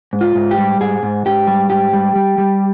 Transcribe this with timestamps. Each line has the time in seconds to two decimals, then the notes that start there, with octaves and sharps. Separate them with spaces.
0.13 G#2
0.21 F4
0.35 G#2
0.51 G4
0.58 G3
0.80 G#2 G#4
1.03 G#2
1.26 G#2 G4
1.47 G3
1.70 G#2 G4
1.93 G3
2.16 G3
2.38 G3